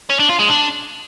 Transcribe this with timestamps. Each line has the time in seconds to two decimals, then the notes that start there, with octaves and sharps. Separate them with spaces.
0.10 C#4
0.19 D4
0.29 F4
0.39 G#3
0.49 D4